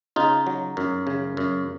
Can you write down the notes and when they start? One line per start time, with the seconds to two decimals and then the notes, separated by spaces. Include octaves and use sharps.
0.16 C#3 D#4 F4
0.47 F#3
0.77 F#2
1.07 C#3
1.37 F#2